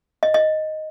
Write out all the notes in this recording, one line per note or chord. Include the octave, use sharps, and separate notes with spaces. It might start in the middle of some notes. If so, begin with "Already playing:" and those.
D#5
D#5